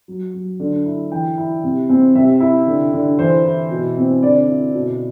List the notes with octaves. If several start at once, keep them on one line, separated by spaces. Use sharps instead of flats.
F#3
F#3
D3
E4
E3 G5
E4
C3
C4
C3 E5
E4
D3
D3
E3 C5
E4
B2
C4
D3 D5
E4
B2